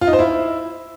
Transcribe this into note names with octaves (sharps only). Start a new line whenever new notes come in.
F4
D#4
C5
E4